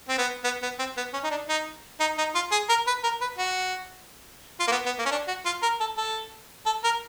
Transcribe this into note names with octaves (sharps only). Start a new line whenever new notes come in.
C4
B3
B3
B3
C4
B3
C#4
D#4
D4
D#4
D#4
D#4
F4
G#4
A#4
B4
A#4
B4
F#4
F4
A#3
B3
B3
A#3
C#4
D4
F#4
F4
A#4
A4
A4
A4
A#4